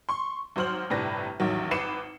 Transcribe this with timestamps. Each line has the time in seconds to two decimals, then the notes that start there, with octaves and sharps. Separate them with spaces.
0.09 C6 C#6
0.56 G#1 F#3 C5 F6 F#7
0.90 G1 A2 C3 D4 B4 A#6
1.40 A1 E2 D#3 F#3
1.71 G#1 B4 D6 C7 C#7 E7